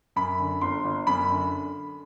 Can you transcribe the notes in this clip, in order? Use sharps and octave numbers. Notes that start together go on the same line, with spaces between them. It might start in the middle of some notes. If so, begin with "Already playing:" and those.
F#2 B5
D3
G1 C6
G1
F#2 B5
D3